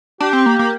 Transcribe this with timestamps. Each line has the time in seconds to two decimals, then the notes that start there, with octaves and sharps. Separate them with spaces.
0.20 D4 G4
0.33 C4
0.46 A#3
0.59 A#3